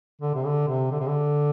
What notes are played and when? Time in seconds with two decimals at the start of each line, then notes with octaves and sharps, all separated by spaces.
0.21 D3
0.35 C3
0.45 D3
0.68 C3
0.91 D3
1.00 C3
1.08 D3